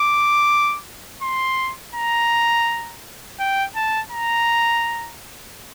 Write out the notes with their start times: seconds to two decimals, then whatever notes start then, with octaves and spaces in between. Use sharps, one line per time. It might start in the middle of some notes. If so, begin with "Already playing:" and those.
Already playing: D6
1.22 C6
1.95 A#5
3.40 G5
3.76 A5
4.12 A#5